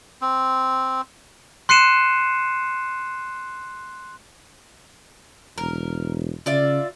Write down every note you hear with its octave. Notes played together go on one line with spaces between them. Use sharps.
C4
C6 F#6 C7 C#7 D#7 E7
E1 A#4
C#3 F4 D5 E5